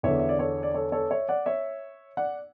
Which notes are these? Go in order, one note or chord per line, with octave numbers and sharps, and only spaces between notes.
E2 D3 C#5 E5
E5
D5
A4 C#5
D5
A4 C#5
A4 C#5
C#5 E5
D5 F#5
C#5 E5
D5 F#5